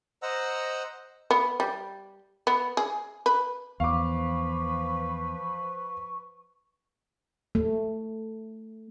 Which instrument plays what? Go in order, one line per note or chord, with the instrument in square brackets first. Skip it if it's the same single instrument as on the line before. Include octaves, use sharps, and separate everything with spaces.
[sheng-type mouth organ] C5 D#5 F#5 A#5 E6
[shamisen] B3
G3
B3
G#4
B4
[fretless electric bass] E2 [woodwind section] F3 B4 [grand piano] F5 D6 [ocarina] C#6
[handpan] A3